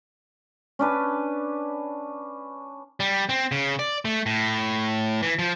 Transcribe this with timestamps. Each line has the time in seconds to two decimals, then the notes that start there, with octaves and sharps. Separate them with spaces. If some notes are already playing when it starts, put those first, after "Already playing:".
0.79 C#4 D4 B4
3.00 G3
3.29 C4
3.52 C#3
3.79 D5
4.05 A3
4.26 A2
5.23 E3
5.39 F3